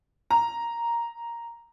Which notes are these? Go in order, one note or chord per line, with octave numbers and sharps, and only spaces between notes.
A#5